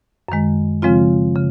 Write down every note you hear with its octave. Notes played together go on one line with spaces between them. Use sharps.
F#2 D#3 G#3
C#3 F3 G#3 C4 F4
C#3